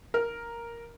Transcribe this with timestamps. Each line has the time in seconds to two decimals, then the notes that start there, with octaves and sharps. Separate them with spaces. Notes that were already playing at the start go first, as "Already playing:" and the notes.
0.14 A#4